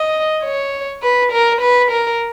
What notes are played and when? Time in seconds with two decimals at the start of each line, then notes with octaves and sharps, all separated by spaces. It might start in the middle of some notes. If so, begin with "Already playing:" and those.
Already playing: D#5
0.43 C#5
1.02 B4
1.32 A#4
1.61 B4
1.91 A#4